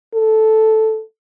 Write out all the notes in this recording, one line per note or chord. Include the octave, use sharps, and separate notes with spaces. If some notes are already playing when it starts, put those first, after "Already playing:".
A4